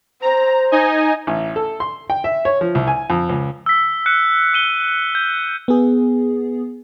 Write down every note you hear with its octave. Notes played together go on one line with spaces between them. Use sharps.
C5 A#5
D#4 D#5 G#5
A1
A4
C6
G5
E5
C#5
F3
C2
G#5
F2
C#2
E6 B6
F#6 C#7
E6 D#7 G7
G6
B3 G#4